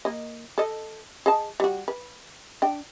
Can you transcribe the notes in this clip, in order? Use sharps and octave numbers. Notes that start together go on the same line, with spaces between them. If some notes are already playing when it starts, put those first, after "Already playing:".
A#3 D#5
A4 D#5
G#4 D#5 A5
G3 F#4
B4
D4 G5